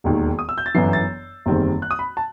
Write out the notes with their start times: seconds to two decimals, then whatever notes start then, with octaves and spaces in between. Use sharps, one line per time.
0.04 E1 D#2 D#3
0.39 D#6
0.49 E6
0.58 G6
0.66 A6
0.74 G1 F#2 E3 B3 C7
0.93 A6
1.46 F#1 E2 D#3 G3 C4
1.82 F#6
1.91 D#6
1.99 B5
2.17 A5